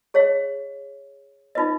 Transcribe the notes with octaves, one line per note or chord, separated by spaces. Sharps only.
G#4 C#5 D#5 F5
D#4 F4 B4 D#5